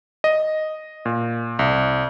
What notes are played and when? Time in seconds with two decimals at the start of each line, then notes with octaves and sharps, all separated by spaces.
0.24 D#5
1.05 A#2
1.59 C2